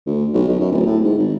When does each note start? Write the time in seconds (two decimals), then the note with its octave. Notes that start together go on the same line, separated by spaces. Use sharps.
0.06 D2
0.34 B1
0.48 B1
0.60 F#2
0.72 D1
0.86 A2
1.04 G#2
1.18 G#1